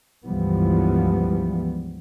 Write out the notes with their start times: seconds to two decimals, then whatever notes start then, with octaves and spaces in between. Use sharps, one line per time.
0.24 C#2 G2 E3 F3 G3 B3